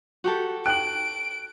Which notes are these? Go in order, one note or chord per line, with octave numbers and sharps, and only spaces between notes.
F#4 G4 A4
G5 F#6 D7 F#7